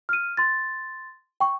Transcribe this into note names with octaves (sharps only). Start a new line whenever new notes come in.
F6 D#7
C6 A6
G5 C#6